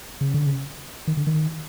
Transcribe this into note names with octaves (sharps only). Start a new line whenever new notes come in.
C#3
D3
C#3
D#3
D3
D#3